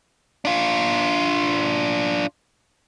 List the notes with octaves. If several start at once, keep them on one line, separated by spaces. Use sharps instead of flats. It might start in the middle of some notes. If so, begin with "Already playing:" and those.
D4 F4